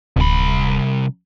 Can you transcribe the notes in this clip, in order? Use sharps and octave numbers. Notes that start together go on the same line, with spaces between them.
D1 C2 B5